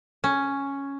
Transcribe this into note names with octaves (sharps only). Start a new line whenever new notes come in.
C#4